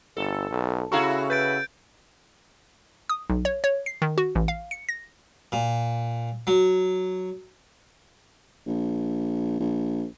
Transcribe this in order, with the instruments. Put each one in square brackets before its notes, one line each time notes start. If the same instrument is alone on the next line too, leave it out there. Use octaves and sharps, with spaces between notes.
[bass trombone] G1 [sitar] A4
[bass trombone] B1
[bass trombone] C#3 [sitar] E4 F#4 A4 [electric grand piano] F5 A#5 C#6
[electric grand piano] B4 [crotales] G6 A6 D7
[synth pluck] D#6
B1
C#5
C#5
C7
D#3
F#4
A1
F5
C#7
A#6
[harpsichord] A#2
F#3
[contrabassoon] A#1
A#1